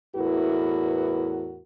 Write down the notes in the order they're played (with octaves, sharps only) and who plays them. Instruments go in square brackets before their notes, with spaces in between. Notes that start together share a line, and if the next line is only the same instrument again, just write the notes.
[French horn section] E2 A2 E4 F#4 A#4 B4